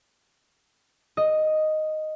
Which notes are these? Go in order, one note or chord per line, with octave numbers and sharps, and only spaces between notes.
D#5